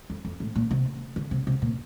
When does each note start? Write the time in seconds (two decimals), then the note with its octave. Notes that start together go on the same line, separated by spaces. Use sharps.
0.10 F2
0.25 F2
0.40 A2
0.56 A#2
0.71 C3
1.16 D3
1.31 C3
1.47 C3
1.62 A#2